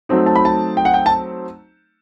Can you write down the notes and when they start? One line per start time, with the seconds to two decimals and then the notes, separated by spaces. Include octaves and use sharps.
0.09 F#3 A3 C4 D#4
0.26 A5
0.36 B5
0.45 A5
0.77 G5
0.85 F#5
0.94 G5
1.06 A5